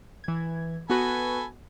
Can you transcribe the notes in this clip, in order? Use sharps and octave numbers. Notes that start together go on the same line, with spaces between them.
E3 G#6
B3 F#4 A4 B4 G#5 B5